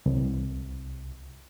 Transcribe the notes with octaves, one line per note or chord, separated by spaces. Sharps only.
C2